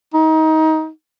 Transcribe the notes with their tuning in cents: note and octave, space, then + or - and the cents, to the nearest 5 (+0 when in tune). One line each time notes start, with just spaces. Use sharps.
D#4 +25